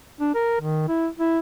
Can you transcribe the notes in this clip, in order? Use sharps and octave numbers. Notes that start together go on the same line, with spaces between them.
D4
A#4
D#3
E4
E4